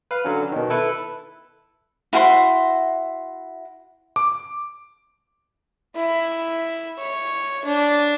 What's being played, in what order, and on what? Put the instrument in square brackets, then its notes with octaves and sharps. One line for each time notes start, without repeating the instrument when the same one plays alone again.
[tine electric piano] B4 F5
D3 F#3 C#4
B2 D#3
E4 A4 B4
[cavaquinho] E4 F#4 C5 C6
[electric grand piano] D6
[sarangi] E4
C#5
D4